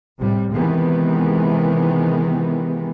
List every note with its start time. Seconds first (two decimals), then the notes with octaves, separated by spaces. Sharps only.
0.19 A2 C3 G3
0.54 C3 D#3 E3 G#3 B3